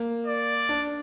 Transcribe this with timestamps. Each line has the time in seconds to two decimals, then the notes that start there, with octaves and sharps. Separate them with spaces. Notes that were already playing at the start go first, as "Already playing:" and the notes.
Already playing: A#3
0.27 D5
0.69 D4